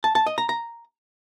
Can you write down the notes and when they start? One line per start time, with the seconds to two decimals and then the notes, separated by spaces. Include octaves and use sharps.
0.04 A5
0.15 A5
0.27 D#5
0.38 A#5
0.49 A#5